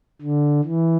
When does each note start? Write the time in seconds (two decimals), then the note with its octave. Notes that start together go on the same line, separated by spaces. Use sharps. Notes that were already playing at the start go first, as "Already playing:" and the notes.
0.21 D3
0.64 E3